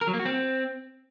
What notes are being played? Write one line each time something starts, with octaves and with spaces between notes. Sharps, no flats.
A#4
F#3
A#3
F#4
C4